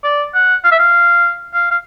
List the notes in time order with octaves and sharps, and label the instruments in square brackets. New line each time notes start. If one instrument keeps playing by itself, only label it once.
[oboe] D5
F#5
F5
E5
F5
F5
F5